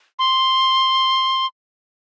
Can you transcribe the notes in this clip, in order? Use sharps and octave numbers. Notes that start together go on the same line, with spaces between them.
C6